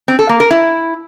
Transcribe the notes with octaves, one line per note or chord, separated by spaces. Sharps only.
C4
A4
A#3
A#4
E4